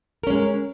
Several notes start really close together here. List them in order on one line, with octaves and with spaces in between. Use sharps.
A#4 C#4 G#3